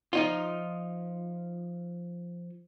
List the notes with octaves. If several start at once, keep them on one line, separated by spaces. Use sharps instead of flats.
F3 D#4 F4